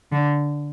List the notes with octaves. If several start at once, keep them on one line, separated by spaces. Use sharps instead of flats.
D3